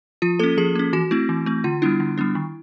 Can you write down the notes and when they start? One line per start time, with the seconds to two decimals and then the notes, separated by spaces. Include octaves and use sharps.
0.22 F3 F4
0.39 A#3 C#4 A4
0.58 F3 G#4
0.75 A#3 C#4
0.93 E3 F#4
1.11 A3 C4 E4
1.29 E3
1.46 A3 C4
1.64 D3 F4
1.82 G3 B3 D4 E4
2.00 D3
2.18 G3 B3 D4
2.35 D#3